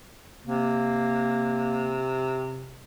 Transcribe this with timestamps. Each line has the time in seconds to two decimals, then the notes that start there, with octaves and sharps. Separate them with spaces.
0.45 C3 A#3